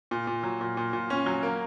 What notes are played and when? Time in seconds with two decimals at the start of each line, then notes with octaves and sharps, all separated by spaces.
0.11 A#2
0.27 A#2
0.43 F#3
0.61 A#2
0.77 A#2
0.93 A#2
1.10 C#4
1.26 F#3
1.43 A#3